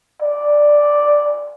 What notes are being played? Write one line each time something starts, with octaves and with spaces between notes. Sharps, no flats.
D5